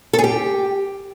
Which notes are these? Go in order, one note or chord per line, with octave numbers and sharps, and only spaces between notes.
A4
G#4
G4